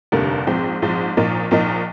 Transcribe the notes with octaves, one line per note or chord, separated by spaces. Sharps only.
F1 D#2 D3 G3 A#3
A#1 G#2 F3 C4
A#1 G#2 F3 C4
A#1 A#2 F3 A#3 D#4
A#1 A#2 F3 A#3 D#4